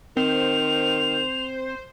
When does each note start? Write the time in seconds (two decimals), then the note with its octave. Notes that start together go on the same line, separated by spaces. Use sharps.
0.17 D#3 C4 C5 F7